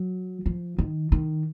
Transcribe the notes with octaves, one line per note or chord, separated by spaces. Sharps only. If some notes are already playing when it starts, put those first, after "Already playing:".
Already playing: F#3
F3
D#3
D#3